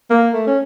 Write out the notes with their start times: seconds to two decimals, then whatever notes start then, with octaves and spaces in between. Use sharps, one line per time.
0.10 A#3
0.33 A3
0.47 C#4